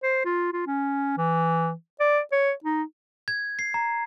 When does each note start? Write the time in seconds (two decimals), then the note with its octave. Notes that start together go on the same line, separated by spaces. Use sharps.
0.03 C5
0.25 F4
0.53 F4
0.67 C#4
1.18 E3
2.00 D5
2.32 C#5
2.64 D#4
3.28 G#6
3.59 C7
3.74 A#5